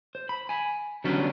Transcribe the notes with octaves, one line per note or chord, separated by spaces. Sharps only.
C5
B5
G#5 B5
D3 F#3 G3 B3 C#4 D4